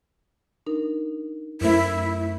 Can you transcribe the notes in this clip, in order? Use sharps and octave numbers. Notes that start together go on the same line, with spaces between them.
D4 D#4 A#4
F#2 A3 E4 A#4 C5 E5